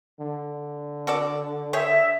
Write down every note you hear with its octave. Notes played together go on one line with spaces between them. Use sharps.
D3
F#4 A4 D5
G4 G#4 C#5 E5